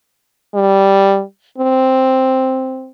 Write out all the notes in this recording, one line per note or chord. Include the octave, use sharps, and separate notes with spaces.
G3
C4